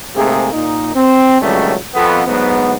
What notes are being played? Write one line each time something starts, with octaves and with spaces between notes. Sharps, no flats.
G#2 C3 A3 A#3 G#4
A#2 D#4
C4
G#1 C#2 F#3 G3 A3 C#4
F2 B3
D2 G#2 F#3 B3